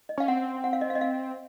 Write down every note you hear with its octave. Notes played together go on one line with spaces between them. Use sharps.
D#5
C#4 F5
C4 F#5
F#5
F5
D#5
F5
D#5
F5